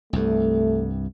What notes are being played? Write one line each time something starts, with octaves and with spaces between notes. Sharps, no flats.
C2 G2 A3